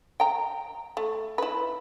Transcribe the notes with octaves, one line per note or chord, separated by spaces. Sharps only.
G5 A#5
A3
E4 B4